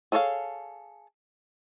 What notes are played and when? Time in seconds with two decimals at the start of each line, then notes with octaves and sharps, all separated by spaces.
0.12 G#4 A4 C#5 D5 F5